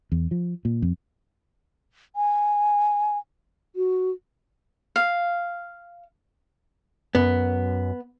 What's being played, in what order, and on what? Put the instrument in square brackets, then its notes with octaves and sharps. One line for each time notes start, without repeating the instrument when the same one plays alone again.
[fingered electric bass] E2
F3
A#2
F2
[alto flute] G#5
F#4
[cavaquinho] F5
[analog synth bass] F#2 [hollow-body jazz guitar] B3